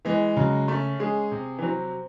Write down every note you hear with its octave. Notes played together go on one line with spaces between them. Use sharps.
E3 G#3
C#3 F#3
A3 C#4
G#3 G#4
C3
E3
F#3 C4